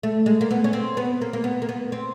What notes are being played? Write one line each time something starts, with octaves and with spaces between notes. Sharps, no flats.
A3
G#3
A#3
B3
C#4
C4
B3
A#3
A#3
B3
A#3
B3
C4